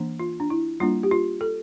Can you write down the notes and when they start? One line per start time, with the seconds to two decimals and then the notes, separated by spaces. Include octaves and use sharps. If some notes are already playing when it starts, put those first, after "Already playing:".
Already playing: E3 A#3 D4
0.19 F4
0.40 D4
0.50 E4
0.80 G3 A#3 D4 F4
1.03 G4
1.11 F4
1.41 A4